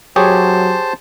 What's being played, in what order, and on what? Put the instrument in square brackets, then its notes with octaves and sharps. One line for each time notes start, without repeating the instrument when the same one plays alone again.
[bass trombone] F#3 [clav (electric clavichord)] G4 G#4 C#5 [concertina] C5 A5